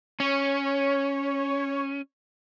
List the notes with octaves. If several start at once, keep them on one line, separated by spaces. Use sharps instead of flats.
C#4 C#5